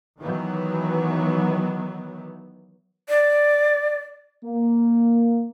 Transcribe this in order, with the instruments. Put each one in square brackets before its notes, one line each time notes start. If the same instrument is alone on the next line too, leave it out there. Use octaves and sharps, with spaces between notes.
[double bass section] D#3 E3 F#3 B3
[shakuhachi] D5
[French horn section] A#3